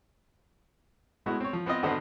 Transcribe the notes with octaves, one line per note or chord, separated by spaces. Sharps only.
A2 G#3 B3 E4 F#4
C4 C#5
F3
B3 C4 F4 D#5
G#1 D3 B3 C5 D#5 B5